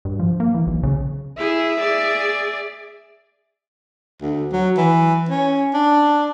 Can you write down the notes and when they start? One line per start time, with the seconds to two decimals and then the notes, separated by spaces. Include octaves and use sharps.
0.05 G2
0.20 F3
0.40 A#3
0.54 E3
0.67 B1
0.83 C#3
1.38 E4 G#4 E5
1.80 G#4 D5
4.21 D2
4.52 F#3
4.77 E3
5.29 C#4
5.74 D4